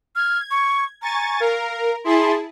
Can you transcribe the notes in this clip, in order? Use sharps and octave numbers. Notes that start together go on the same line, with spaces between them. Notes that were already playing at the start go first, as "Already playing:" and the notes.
F6 G#6
C#6
G#5 A#5 C#6 A6
A#4 F5
E4 G#4 A5 C6